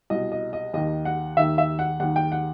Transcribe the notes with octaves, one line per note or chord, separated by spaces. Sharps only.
C2 B2 D#5
D#5
D#5
D#2 D#3 D#5
F#5
D#2 D#3 E5
E5
F#5
D#2 D#3 F#5
G5
F#5